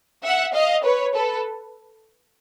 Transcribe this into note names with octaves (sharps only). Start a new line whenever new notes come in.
E5 F#5
D#5 F5
B4 C#5
A4 B4